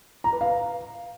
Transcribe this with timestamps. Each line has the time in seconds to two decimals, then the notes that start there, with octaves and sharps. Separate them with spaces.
0.24 A#5
0.33 B4
0.41 F5